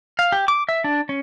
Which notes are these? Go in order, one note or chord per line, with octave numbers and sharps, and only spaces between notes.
F5
G4
D6
E5
D4
C#4